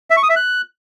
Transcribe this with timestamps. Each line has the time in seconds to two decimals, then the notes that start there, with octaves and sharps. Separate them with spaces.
0.10 E5
0.17 C#6
0.23 D#6
0.29 E5
0.36 F#6